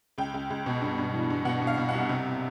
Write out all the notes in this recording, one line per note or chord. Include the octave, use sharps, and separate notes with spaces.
C#2 G5
C#2
C#2
B2
G2
G2
E3
G2
B2 F#5
B2
F5
B2
C2 F#5
C3